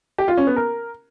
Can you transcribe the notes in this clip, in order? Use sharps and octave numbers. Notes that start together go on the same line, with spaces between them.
G4
F4
C#4
B3
A#4